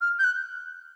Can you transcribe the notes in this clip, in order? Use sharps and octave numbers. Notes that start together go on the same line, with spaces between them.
F6
G6
F#6